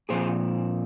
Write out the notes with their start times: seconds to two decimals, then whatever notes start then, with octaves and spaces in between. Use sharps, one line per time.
0.09 A#2 F3 C4 G#4 C5